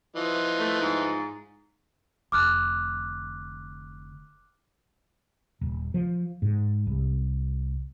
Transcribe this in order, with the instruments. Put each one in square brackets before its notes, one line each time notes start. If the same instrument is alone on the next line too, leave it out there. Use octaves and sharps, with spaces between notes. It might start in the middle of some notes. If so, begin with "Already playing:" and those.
[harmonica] E3 F3 D#5
[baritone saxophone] A3
G#2
[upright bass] F1 D3 [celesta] D6 F6 F#6
[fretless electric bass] D#1
F3
G#2
C2